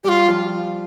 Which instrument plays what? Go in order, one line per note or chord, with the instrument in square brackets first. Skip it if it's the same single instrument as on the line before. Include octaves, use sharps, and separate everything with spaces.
[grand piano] G3 [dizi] F4 G4
[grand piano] F3